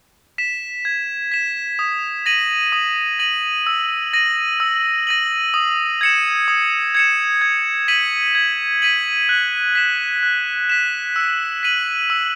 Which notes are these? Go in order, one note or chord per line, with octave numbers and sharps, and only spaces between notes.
B6 E7
G#6
B6 E7
D#6
A#6 D#7 F#7
D#6
A#6 D#7 F#7
E6
A#6 D#7 F#7
E6
A#6 D#7 F#7
D#6
G#6 C#7 E7
D#6
G#6 C#7 E7
G#6
B6 D#7 F#7
G#6
B6 D#7 F#7
F#6
B6 E7
F#6
B6 E7
E6
B6 D#7 F#7
E6